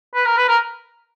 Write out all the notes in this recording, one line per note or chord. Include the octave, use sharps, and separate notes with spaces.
B4
A#4
B4
A#4